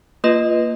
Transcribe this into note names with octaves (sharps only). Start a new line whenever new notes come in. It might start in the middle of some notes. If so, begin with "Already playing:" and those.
A#3 F4 B4 D#5